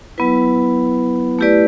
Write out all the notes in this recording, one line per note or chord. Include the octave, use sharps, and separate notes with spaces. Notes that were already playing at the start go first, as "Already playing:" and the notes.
F#3 B3 E4 B4
A3 E4 G4 B4 D5